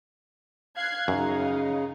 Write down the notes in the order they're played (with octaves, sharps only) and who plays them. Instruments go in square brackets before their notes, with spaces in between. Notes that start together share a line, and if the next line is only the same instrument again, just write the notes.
[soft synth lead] F5 [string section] F#6 G#6 C7
[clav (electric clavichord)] F#2 [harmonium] C#3 [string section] D#4